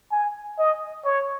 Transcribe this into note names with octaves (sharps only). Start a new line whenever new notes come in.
G#5
D#5
C#5